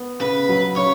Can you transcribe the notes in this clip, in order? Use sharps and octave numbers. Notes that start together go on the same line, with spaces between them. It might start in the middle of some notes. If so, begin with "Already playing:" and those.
Already playing: B3
C#3 B4
F#3
C#3 C#5